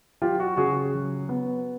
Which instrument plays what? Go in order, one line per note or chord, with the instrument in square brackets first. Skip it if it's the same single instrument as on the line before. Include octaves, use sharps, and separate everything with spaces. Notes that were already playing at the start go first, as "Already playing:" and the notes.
[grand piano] F#3 F4 G4
F#4
C#3 F#4 G#4
F#3
B3